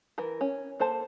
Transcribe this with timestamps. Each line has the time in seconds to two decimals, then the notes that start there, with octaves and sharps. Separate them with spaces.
0.18 E3 A#4
0.41 C#4
0.80 A#3 A4 C5 A5